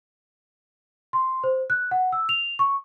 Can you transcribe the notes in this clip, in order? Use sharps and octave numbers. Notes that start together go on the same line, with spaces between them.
C6
C5
F#6
F#5
E6
F7
C#6